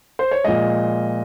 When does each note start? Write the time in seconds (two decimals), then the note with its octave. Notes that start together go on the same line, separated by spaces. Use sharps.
0.19 C5
0.31 C#5
0.45 A#2 F3 G#3 D#5